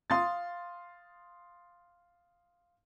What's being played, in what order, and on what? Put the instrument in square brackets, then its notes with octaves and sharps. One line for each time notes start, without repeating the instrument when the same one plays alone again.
[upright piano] F5 C6 D#6 A6